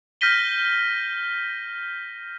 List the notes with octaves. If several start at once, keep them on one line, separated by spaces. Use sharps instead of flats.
F6 G6 A#6 B6 D#7 G7